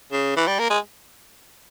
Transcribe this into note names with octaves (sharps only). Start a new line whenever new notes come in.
C#3
E3
G3
A#3
G#3